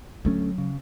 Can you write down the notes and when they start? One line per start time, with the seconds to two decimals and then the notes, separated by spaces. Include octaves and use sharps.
0.25 D2 F#3 A3 C#4
0.58 C#3